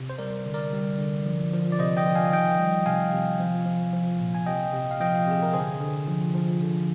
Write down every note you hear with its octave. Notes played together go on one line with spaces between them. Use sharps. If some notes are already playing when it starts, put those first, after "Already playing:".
Already playing: C3
C5
G3 A#4 D5
D3
A#4 D5
G3
D3
F3
F3
D5
C3 C5 D#5
D#5 G5
F3
F5 G#5
D#3 D#5 G5
G3
C3 F5 G#5
C3
F3
F3
F3
A#2
G#5
C3 D#5 G5
C3
F5
F3 D#5 G5
C3 G#4
A#4
D3 G#4 C5
D3
F3
F3
D3